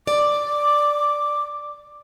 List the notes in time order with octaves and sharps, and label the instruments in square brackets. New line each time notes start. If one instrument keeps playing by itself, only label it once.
[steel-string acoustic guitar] D5 [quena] D6